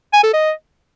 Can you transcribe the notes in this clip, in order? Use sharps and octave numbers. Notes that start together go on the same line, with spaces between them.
G#5
A4
D#5